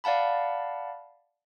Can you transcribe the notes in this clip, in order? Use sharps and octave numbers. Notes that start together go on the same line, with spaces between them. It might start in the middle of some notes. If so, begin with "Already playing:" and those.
D5 F5 F#5 A5 B5